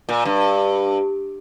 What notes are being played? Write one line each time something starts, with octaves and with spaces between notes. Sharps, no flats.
A#2
G2